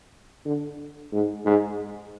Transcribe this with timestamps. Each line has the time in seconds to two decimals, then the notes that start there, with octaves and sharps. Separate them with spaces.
0.45 D3
1.13 G#2
1.46 G#2